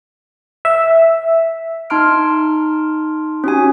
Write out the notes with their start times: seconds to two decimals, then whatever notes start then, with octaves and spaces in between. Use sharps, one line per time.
0.65 E5
1.90 D#4 A5 C6 F6 D7
3.44 C#4 F#4 G4 G#5